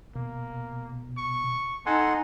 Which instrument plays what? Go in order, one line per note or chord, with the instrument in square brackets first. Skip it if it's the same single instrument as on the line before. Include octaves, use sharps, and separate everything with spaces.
[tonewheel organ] B2 [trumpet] A#3
[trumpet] C#6
[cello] D#4 [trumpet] A4 [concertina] F#5 G#5 C6